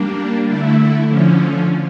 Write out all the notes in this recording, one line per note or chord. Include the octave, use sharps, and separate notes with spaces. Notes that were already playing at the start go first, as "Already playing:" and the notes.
Already playing: G3 A#3 D4
D3 A3 E4
D3 F3 C#4